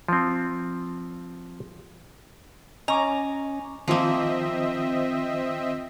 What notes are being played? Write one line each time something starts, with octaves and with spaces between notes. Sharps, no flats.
F3 C4
C#4 D#5 G#5 A#5 C#6 D6
D#3 F3 A#3 C4 F4 D#5 E5